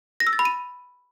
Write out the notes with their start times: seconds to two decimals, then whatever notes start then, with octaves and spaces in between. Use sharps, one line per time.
0.20 A#6
0.27 E6
0.33 A6
0.39 B5
0.45 D#7